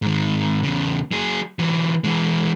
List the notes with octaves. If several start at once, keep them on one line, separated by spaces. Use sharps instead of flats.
G#2 D#3
E2 C#3
F#3 G#4
E3 F#3
E3 G#3